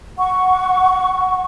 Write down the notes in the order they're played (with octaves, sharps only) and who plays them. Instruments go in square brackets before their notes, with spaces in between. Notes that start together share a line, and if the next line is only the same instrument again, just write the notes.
[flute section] F#5 C#6